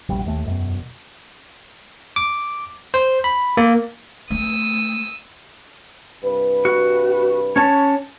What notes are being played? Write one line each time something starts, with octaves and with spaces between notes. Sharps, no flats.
E1 A#1 G3
D#2 A3
E1 F#2 B2
D6
C5
B5
A#3
A3 D#6 E6
C2 G2 B4
F#4
C#4 C#5 A5